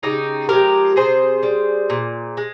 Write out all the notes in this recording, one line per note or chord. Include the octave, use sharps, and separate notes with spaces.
C#3 D#4 G4
F3 G#3 G4 A#4
C3 G#4 C5
G3
A#2
G#3